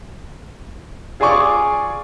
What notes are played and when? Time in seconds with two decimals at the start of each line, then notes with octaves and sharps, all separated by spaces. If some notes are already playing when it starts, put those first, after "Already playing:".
1.20 F4 G#4 D5 G#5 C#6 D6